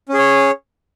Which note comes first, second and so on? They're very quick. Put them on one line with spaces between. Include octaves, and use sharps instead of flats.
C#4 G#4 C#5